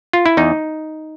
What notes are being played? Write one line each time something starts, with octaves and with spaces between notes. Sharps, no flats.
F4
E4
E2 D#4